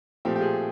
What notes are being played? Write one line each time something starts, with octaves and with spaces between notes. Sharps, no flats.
A#2 F3 A3 C4 G4
G4
G#4